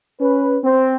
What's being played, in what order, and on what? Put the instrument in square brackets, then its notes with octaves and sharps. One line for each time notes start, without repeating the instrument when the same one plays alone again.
[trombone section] C#4 B4
C4